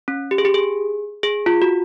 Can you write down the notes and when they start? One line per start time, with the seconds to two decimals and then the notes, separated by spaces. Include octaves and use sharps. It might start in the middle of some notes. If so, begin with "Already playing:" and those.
0.08 C#4
0.31 G4
0.38 G#4
0.45 G4
0.54 G#4
1.23 G#4
1.46 F4
1.62 F#4